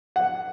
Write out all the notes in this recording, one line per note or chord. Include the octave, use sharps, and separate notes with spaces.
F#5